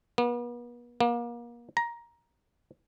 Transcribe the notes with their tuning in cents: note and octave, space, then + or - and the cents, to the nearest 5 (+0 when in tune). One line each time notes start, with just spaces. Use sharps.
B3 -40
A#3 +35
A#5 +15